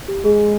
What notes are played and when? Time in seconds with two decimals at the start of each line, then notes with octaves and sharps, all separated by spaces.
0.08 G4
0.24 G#3 G#4